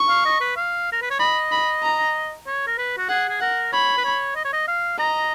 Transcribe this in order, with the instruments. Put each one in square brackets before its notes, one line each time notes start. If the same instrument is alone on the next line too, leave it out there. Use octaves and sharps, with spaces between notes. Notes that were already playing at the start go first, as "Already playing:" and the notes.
Already playing: [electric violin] C#6
[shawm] F5
D#5
B4
F5
A#4
B4
C#5
[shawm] D#5 [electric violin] B5
[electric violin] B5
A#5
[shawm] C#5
A#4
B4
F#4
[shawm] G#4 [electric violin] F#5
[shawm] G#4
[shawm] A#4 [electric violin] F#5
[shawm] C#5 [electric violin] B5
[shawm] B4
C#5
D#5
C#5
D#5
F5
[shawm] D#5 [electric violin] A#5